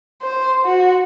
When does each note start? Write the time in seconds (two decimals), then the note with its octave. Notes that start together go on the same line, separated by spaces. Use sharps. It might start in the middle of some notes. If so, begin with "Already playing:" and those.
0.22 C5
0.65 F#4